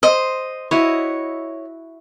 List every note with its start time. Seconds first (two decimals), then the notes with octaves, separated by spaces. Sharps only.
0.03 C5 D#5
0.71 E4 F#4 C#5 D#5